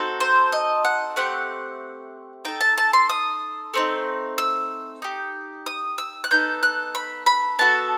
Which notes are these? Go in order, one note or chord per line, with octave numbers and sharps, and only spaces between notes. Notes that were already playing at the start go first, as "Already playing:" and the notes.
Already playing: C4 D#4 F#4 A4
C5
D#5
F#5
A3 C4 G4 F#5
D#4 A4 G5
A5
A5
C6
D#6
A3 C4 D#4
E6
D#4 G4
D#6
E6
F#6
B3 D#4 A4 G6
F#6
B5
B5
B3 F#4 A4 A5